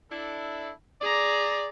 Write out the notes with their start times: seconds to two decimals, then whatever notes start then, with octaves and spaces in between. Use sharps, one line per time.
0.11 D4 E4 A4
1.02 G#4 D5 A#5